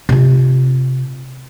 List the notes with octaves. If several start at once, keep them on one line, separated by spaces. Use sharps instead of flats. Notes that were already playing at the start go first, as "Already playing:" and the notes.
C3 F4